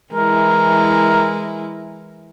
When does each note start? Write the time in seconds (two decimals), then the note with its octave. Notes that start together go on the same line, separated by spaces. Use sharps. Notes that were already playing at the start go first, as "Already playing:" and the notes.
0.13 E3 G#3 E4 A#4